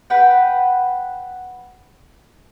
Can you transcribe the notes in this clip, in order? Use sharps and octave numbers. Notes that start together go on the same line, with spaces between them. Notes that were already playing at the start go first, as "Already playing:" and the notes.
B4 F#5 G5